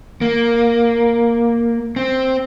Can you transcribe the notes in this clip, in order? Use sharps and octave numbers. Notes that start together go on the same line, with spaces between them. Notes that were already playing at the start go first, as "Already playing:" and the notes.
A#3
C4